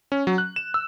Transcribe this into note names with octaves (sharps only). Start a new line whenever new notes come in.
C#4
F#3
F#6
E7
E6